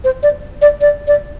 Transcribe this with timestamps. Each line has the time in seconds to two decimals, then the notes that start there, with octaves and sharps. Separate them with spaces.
0.04 C5
0.23 D5
0.62 D5
0.81 D5
1.08 D5